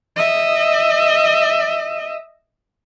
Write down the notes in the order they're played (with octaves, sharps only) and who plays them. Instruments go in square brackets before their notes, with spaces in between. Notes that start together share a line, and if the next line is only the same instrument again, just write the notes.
[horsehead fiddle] D#5 E5